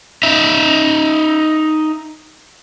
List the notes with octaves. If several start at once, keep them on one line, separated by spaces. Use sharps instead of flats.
D#4 E5